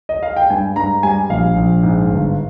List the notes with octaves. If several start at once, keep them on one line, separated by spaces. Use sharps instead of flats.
D#5
F5
G5
G2 G#5
G2 A#5
G3 G#5
A#1 F5
A#1
G#2
G1